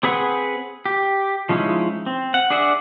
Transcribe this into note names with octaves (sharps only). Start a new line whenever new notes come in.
C4 G#4 B4 F#5 G#5
G4
F3 G#3 C#4 D#4 E4
C4
F#5
D4 G#4 D5 E5 F#5